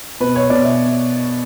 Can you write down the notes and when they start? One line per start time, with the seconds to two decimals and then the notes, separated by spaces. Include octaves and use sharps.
0.20 B2 B4
0.35 C#5
0.50 B2 D5
0.65 E5